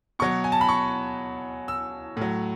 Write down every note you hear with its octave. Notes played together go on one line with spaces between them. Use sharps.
B2 F#3 C#6
G#5
A5
B5
C#6
E6
A2 F#3